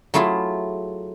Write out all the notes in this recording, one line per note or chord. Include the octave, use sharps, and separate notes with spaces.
F#3 A3 E4 F4 G#4